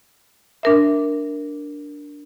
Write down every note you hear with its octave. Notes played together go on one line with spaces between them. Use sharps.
D4 A#4 E5